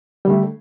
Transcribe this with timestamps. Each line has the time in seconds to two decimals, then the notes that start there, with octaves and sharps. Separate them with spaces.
0.25 G3
0.27 D3
0.30 A3